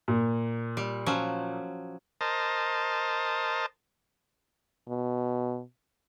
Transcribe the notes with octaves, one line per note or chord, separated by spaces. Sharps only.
A#2
G3
F3 F#3 C#4
A#4 C5 D#5 A5
B2